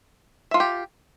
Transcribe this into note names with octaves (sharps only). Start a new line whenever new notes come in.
F4 G4 A4 E5